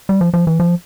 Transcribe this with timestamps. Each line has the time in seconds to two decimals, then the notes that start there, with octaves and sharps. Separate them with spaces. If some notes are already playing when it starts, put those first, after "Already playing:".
0.09 G3
0.21 F3
0.34 F3
0.47 E3
0.60 F3